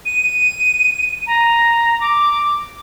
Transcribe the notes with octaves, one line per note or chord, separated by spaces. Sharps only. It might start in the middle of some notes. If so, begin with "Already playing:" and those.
D#7
A#5
D6